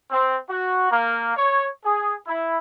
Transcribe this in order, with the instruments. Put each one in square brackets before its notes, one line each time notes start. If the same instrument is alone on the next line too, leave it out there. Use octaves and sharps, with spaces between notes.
[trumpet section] C4
F#4
A#3
C#5
G#4
E4